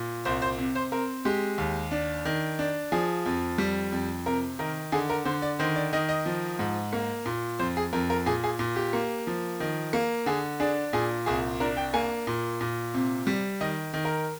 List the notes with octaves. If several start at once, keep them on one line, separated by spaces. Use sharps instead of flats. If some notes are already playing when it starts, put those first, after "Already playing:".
Already playing: A#2
C2 C5
C5
C3
C5
C4 A#4
G#3 G4
D#2
D4
D#3
D4
F3 G#4
F2
G3
F2
C3 A#4
D#3 A#4
D3 G#4
A#4
D3 C5
D5
D#3 C5
D5
D#3 D#5
D#5
F3
G#2
A#3
A#2
F2 C5
G#4
F2 A#4
A#4
A#2 G#4
G#4
A#2
G4
A#3
F3
D#3
A#3
D3 G#4
D4 G#4
A#2 G#4
C2 G#4
D4 A#4
G5
A#3 G#5
A#2
A#2
C3
G3
D#3 D#5
D#3
A#4